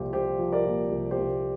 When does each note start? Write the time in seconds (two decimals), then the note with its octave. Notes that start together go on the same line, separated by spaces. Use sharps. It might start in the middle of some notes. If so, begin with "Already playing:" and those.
Already playing: C2 A#2 F3 F4 G4
0.13 C2 G4 C5
0.39 F3
0.52 A#4 D5
0.65 A#2
0.92 C2
1.11 G4 C5
1.18 C2